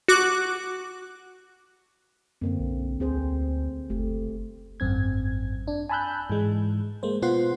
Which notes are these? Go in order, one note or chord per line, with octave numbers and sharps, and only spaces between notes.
F#4 D6 F#6
F#2 D3 A#3 C4
B1
D2 C4 G#4 C5
F#1 A3 G4
G#1 F#2 C4 G#6
D4
G#5 A5 B5 E6 F#6 G6
G#2 E3 G#3
G#3 A#3 C5
B2 B3 F4 C5 F#5 C6